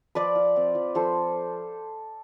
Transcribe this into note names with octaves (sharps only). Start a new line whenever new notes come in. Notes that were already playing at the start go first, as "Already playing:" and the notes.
F3 B4 D5
F4
C4
F3
F3 A4 C5